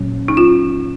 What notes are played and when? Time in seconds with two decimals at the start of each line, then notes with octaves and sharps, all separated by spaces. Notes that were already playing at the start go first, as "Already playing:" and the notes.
Already playing: A#2 F#3 C#4
0.28 D#4
0.37 F4